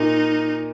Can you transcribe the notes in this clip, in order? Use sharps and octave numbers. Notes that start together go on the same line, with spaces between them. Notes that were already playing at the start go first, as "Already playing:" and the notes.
Already playing: A#2 D#4